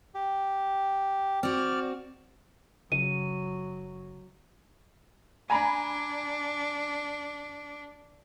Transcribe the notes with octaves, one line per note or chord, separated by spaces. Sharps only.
G4
C4 F#4 D5 F6
F#1 C#3 F#3 D#7
D4 G#5 A#5 B5